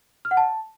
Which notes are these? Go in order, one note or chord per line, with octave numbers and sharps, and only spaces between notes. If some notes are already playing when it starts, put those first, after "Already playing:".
F6
F#5
A5